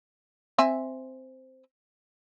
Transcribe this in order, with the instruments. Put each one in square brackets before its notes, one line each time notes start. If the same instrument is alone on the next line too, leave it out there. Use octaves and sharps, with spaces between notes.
[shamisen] C4 E5 G#5